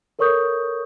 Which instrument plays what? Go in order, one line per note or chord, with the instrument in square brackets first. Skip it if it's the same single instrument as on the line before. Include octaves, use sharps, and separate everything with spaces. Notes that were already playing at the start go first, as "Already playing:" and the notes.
[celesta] A4 A#4 C#5 C#6 D#6 G6